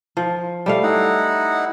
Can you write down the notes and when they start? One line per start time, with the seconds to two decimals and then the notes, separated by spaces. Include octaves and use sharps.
0.17 F3
0.66 G3 A3 F5
0.83 D#4 E4 F#5